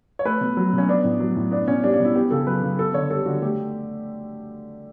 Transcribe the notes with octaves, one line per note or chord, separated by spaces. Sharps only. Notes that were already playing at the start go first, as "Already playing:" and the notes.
C#5
A3 B4
B2
F#3
B2 C#4
B3 D4
A2
F#3
A2
B3 D4
B2 C#4
G3 D4
D4
B2
E4
B3 G4
C#3 A4
F#3 B4
C#3
B3 A4
D3 C#5
G3 A4
D3 F#4
A3 G4